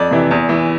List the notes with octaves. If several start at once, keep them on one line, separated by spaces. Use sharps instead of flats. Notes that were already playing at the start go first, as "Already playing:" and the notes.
Already playing: F2 D5
C3 E3
E2
E3